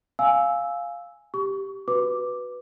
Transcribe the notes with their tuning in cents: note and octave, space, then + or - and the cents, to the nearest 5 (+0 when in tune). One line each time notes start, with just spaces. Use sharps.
F5 +0 G#5 +0 E6 -10
G4 +0 C#6 +25
F#4 +0 B4 +0 D6 +0